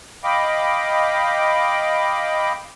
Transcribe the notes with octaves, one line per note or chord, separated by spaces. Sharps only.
D#5 F5 G5 B5 D6